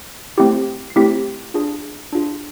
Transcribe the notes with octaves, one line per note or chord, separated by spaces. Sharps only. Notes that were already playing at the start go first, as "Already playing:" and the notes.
A3 C4 E4 G4
C7
A3 C4 E4 G4 B6
D4 F4 G#4
D4 F4 G#4